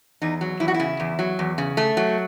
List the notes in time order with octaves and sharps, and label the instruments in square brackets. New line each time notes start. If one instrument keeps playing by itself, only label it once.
[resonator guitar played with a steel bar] E2 D#4
F#3
E2 E4
F#4
E4
C#3
E2
F#3
E2
C#3
A3
F#3